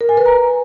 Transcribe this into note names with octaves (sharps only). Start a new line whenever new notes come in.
A#4
G#5
B4
A#5